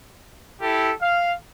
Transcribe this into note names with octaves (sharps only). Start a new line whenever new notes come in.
E4 G4 A4
F5